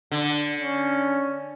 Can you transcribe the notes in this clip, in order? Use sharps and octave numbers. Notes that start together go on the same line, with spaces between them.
D3
C#4